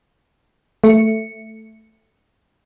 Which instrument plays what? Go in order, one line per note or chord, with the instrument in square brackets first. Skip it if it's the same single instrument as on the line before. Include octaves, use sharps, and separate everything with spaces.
[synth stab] A3 C#7